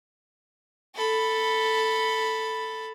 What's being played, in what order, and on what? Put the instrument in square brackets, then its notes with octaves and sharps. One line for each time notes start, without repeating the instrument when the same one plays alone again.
[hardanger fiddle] A4 B5